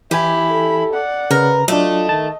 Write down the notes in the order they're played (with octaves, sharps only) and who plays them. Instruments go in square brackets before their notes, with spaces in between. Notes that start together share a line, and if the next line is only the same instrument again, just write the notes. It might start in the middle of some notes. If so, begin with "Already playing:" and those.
[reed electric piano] E3 G#5 [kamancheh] E4 B5 [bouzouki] G4
[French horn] A4
[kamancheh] D5 F#5
[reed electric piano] C#3 [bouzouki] A#4 [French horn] B4
[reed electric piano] F#3 D4 [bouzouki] A3 [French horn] F4 [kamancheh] D#5
[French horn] D#3 [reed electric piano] A5